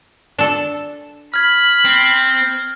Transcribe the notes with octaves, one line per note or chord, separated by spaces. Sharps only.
D4 A4
B5 F6 G#6
C4